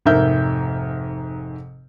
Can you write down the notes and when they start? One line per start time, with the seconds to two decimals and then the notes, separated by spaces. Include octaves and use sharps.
0.05 F1 G#2 A#4 E5 G6